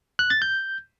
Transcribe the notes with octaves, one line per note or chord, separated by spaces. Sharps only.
F#6
A6
G6